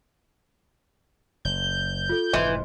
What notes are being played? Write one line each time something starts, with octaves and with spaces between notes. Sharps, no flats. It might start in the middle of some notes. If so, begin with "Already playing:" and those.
F#1 G6
F4 A4
F1 G#2 E3 F3 D#5 C6